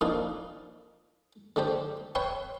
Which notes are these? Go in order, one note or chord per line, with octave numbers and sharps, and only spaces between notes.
F2 A#2 D4 D#4 F5
D3 A3 G4 C5
B4 C#5 E5 G5 C6